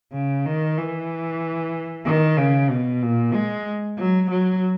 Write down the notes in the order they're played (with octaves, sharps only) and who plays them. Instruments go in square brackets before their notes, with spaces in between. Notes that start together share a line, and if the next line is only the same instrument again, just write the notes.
[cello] C#3
D#3
E3
D#3
C#3
B2
A#2
G#3
F#3
F#3